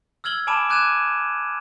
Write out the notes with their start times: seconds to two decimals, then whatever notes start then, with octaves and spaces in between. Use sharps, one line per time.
0.24 E6 F6 G#6 F#7 G7
0.47 G#5 A5 B5 D6 D7 E7
0.70 D6 F#6 G#6 D#7 E7